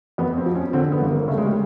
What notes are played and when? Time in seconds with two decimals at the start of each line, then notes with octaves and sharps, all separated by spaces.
0.18 F2 B3
0.37 C4
0.46 F3
0.55 C#4
0.73 D3 C4
0.92 B3
1.01 G1
1.10 A#3
1.28 C#3 A3
1.38 G#3
1.46 G3